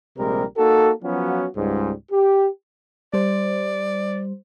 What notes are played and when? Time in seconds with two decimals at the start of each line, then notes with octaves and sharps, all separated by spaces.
0.17 A#1 C3 G3 G#3 A#4
0.58 A#3 D#4 F#4 A4
1.02 F3 F#3 B3 C#4 F4 F#4
1.56 C#2 G#2 G3
2.12 G4
3.14 G3 C5 D5